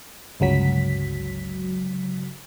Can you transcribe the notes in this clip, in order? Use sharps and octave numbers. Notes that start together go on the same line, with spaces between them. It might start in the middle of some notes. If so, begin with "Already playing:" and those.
G1 C#2 F#3 B6